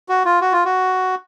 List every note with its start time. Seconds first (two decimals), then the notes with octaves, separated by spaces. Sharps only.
0.09 F#4
0.25 F4
0.41 F#4
0.52 F4
0.65 F#4